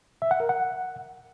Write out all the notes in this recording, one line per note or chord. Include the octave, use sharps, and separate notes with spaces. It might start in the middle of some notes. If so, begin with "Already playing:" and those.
E5
F#5
A#4
F#5